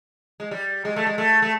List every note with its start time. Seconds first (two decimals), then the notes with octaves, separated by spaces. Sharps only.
0.40 G#3
0.51 G3
0.85 G#3
0.96 A3
1.06 G#3
1.18 A3
1.42 A3